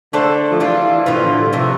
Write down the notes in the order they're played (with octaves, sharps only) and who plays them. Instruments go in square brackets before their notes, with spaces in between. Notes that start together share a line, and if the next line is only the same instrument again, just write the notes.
[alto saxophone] D3 [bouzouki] A3 D4 A4 C5
[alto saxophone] F3
[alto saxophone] E3 [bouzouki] G3 D4 F4
[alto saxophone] E3
[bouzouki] A2 F3 B3 F4 [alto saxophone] D3
[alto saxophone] E3
D3
G3
[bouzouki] C3 E3 A3 [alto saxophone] F3